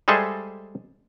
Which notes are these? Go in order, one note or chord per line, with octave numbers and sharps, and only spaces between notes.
G3 G#3 G#4 A4 C5 E5